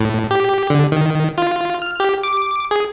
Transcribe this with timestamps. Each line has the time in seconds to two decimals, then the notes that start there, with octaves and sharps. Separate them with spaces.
0.01 A2
0.31 G4
0.70 D3
0.92 D#3
1.38 F4
1.82 F6
2.00 G4
2.23 D6
2.71 G#4